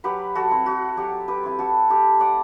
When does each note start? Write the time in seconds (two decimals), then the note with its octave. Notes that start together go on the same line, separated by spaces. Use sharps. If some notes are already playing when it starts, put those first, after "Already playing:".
0.04 F#3 G4 B4
0.35 F#4 A4
0.51 C4 E4
0.66 F#4
0.97 F#3 G4
1.28 G4 B4
1.43 C4 E4
1.59 F#4 A4
1.90 A3 G4
2.20 D5 F#5